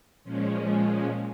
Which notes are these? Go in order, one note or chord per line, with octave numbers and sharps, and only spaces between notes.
A#2 F3 G#3 C#4